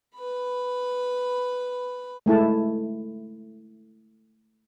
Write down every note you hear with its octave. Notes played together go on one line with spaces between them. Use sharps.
B4 B5
G#3 A3 E4 A5